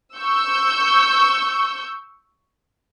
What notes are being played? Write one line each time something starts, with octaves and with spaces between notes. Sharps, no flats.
C#6 E6 G6